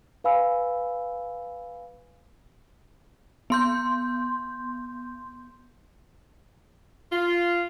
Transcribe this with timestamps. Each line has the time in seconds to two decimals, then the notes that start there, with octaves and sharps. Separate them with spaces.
0.24 B4 F5 G#5 B5 E6
3.50 B3 C6 G6
7.12 F4